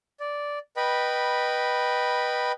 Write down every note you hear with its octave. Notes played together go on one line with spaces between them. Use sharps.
D5
B4 D#5 G5 B5